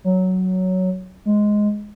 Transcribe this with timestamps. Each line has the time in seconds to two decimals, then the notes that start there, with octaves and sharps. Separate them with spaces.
0.04 F#3
1.26 G#3